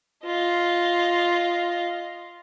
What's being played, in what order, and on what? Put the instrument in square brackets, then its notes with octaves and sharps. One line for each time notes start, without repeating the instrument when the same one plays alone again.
[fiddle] F4 D#5